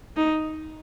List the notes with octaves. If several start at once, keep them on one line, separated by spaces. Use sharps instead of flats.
D#4